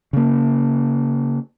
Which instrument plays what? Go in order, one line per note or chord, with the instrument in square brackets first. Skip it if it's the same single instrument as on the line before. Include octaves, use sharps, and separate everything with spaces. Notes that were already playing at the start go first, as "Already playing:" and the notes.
[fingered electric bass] C#3 A#3